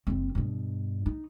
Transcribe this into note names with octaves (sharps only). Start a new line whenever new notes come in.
F#1 C4
G2 B2
D#4